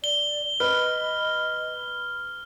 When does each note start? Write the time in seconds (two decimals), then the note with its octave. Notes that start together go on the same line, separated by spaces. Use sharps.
0.04 D5 G7
0.60 B4 D#5 F6